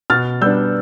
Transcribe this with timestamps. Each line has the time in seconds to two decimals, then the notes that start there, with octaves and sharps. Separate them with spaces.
0.10 B2 F6 A6
0.41 G3 B3 D4 E6 G6